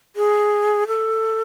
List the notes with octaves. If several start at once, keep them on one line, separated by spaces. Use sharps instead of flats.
G#4
A4